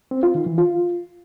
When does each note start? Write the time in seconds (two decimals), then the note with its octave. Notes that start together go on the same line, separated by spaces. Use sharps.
0.11 C4
0.23 F4
0.35 D#3
0.46 E3
0.58 F4